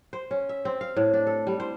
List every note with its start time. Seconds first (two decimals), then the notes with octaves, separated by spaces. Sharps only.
0.13 C5
0.31 C#4
0.49 E5
0.65 C4
0.81 F5
0.97 A2
1.14 D4
1.27 A4
1.47 G3
1.60 C5